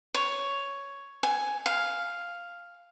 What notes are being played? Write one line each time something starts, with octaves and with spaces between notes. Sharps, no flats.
C#5
G#5
F5